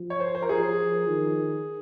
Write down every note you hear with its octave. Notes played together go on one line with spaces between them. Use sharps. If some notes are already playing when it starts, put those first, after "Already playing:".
Already playing: F3
C#5
C5
C5
A#4
F3 G#4
D#3